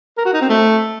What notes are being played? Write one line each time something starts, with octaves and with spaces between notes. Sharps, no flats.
A#4
F#4
D#4
C4
A3